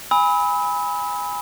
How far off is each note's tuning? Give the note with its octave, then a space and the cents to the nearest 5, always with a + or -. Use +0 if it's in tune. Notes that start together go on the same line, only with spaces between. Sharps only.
G#5 -20 B5 +0 E6 -40